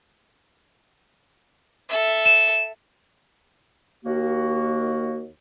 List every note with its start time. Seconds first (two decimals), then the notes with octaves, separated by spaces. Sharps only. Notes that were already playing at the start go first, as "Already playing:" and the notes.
1.89 A4 E5
2.25 E7
4.04 D#2 A#3 F#4